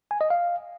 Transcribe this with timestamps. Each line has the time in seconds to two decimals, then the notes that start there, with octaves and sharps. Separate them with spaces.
0.11 G#5
0.21 D#5
0.30 F5